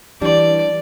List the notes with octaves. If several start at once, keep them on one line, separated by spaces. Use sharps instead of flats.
E3 G3 D4 D5